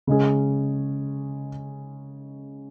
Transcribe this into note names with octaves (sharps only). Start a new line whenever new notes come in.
C#3 G#3 C#4 G#4